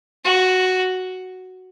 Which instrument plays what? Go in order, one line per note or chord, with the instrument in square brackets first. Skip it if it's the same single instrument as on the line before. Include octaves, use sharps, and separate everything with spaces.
[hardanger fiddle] F#4